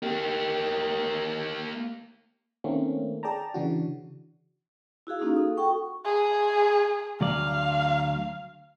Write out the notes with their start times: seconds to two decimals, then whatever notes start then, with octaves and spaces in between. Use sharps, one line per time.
0.03 A#3 G4
2.64 D#3 A3 A#3 C4 C#4
3.23 G#4 D5 G5 A5 A#5
3.54 C#3 E3 D4 F#4
5.07 E4 F#4 G#4 F5
5.19 A#3 C#4 D#4 F4 F#4 G#4
5.36 A4 D#6
5.57 F#4 A4 F#5 G5 C#6
6.05 G#4
7.21 D2 F#3 D5 F5